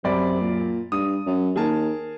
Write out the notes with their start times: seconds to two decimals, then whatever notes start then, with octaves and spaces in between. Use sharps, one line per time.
0.04 F#2 C3 D5 B5
0.40 A#2
0.92 G2 D#6
1.26 F#2
1.56 D#2 G#4 A#4 A5